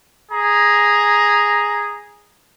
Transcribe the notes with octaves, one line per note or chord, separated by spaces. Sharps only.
G#4 A#5